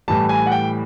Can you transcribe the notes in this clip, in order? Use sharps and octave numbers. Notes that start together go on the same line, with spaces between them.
A2 E3 G3 A5
G#5
F#5
G5